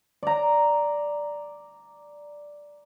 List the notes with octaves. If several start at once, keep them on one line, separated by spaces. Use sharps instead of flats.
D5 A#5